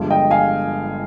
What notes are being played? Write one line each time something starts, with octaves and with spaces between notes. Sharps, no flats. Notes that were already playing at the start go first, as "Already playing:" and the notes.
Already playing: G1 G2 F3 G#3
D#5 G5
F5 G#5